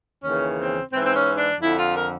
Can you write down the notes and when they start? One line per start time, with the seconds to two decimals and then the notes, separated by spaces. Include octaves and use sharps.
0.23 D#2 C#3 E3 C#4
0.57 C4
0.92 G#2 E3 C4
1.04 C4
1.15 C#4
1.37 D4
1.61 F2 D3 E4
1.77 F4
1.95 A#4